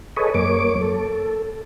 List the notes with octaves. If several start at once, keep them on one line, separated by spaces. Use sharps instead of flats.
G#4 A4 B4 C#5 D#5
F#2 A#3 C#5 D6
A4